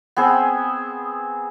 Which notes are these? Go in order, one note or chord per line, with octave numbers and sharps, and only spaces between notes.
B3 C4 G#4